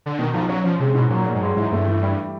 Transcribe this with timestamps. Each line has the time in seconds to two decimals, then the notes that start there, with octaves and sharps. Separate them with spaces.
0.06 D3
0.18 B2 D#3
0.34 B1 F3
0.49 F#3 C#4
0.64 F3 C#4
0.80 C3 G#3
0.94 G#2 B2
1.10 A#2 F#3
1.26 F#3
1.35 G#2
1.41 G2 G#3
1.56 G#2 E3
1.72 G2 A3
1.87 E3
2.03 G3